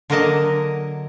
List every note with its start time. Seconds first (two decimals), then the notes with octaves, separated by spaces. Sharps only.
0.10 D3 F#3 A#3 A#4 D#5 A5